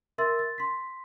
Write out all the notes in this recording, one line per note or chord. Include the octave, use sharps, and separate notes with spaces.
A#4 E5 C6 E6 A6
A6
C6 B6